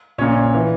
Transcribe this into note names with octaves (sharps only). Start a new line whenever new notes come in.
A#1 A#2 C#4 C#5
E3